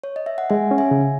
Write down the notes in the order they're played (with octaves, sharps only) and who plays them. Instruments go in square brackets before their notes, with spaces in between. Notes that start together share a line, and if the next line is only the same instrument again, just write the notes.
[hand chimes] C#5
D#5
E5
F#5
[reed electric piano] G#3 [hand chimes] E5 G#5
[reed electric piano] C#4
[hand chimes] E5 G#5
[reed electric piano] C#3